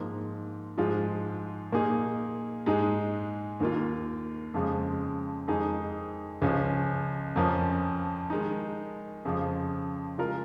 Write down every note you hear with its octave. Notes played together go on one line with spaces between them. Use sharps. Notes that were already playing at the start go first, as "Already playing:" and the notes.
Already playing: G#2 F3 A#3
G#2 F3 G#3 F4
A#2 A#3 D#4 G#4
G#2 G#3 D#4 G#4
D#2 D#3 A#3 F4
F2 C#3 F3 G#3
F2 D#3 G#3 D#4 G#4
C#2 C#3 F3 C#4
F2 F3 C#4 A#4
D#3 G#3 D#4
F2 C#3 F3
C#3 G#3 F4 A#4